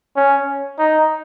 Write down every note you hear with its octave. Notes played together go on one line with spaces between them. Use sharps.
C#4
D#4